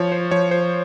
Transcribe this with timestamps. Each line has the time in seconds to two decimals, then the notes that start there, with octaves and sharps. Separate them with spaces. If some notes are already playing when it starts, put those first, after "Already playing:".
Already playing: F3 C#5
0.12 C5
0.31 F3 C#5
0.51 C5